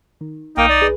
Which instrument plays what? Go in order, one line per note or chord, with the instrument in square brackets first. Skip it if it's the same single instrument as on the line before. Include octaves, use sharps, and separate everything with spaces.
[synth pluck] D#3
[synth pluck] B1 [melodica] A#3 G5 [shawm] D#4
[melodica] D5
[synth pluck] G#4 B4